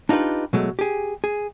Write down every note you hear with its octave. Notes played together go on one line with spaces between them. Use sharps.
D4 D#4 F4 G4 B4
B2 F#3 G#3 A3
G4 G#4
G#4